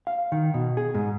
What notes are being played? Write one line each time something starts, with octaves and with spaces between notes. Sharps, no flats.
F5
D#3
B2
G#4
G#2